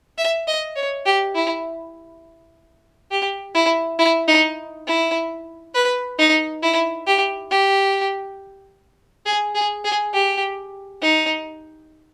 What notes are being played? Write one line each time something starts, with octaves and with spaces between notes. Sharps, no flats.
E5
D#5
C#5
G4
E4
G4
E4
E4
D#4
E4
B4
D#4
E4
G4
G4
G#4
G#4
G#4
G4
D#4